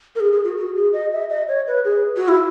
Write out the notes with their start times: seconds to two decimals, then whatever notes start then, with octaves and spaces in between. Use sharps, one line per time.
0.15 A#4
0.20 G#4
0.32 G#4
0.44 F#4
0.57 F#4
0.75 G#4
0.93 D#5
1.12 E5
1.30 D#5
1.48 C#5
1.67 B4
1.85 G#4
2.17 F#4
2.28 E4